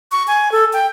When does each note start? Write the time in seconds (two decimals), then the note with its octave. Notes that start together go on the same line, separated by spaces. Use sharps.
0.12 C#6
0.28 G#5
0.52 A4
0.73 G5